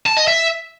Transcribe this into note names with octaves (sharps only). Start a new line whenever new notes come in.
A5
D#5
E5